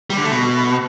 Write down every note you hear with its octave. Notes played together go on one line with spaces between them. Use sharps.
G3
D3
A3
B2